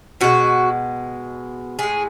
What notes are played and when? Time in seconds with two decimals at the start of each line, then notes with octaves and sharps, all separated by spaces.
0.21 B2 G#3 F#4
1.79 A2 G#3 G#4